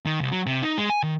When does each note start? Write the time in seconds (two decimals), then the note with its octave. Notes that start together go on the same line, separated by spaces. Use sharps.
0.06 D#3
0.20 C2
0.32 F#3
0.46 C3
0.62 D#4
0.78 G#3
0.90 G#5
1.03 D#3